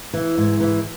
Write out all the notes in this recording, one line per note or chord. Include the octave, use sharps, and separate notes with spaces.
E3
G#2
E3